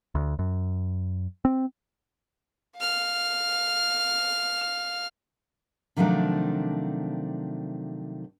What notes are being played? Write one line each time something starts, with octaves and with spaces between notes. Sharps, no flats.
D2
F#2
C4
F5 F6
C3 D#3 F3 F#3 A3 D4